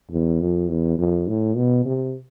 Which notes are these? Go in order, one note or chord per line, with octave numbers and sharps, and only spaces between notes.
E2
F2
E2
F2
A2
B2
C3